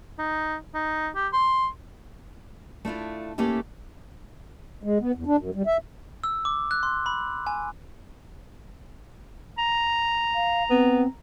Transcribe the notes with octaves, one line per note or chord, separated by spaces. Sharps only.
D#4
D#4
G4
C6
A3 D4 E4 F4
A3 A#3 C#4 E4 G4
G#3
B3
E2
D4
F#2
G3
E5
E6
D6
F#6
C6
B5
G#5
A#5
F5
B3 C4